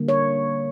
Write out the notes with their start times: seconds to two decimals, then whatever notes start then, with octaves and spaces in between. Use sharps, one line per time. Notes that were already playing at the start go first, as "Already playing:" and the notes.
Already playing: D3 G3 A#3
0.08 C#5